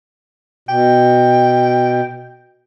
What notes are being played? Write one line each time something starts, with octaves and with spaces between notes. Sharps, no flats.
B2 G5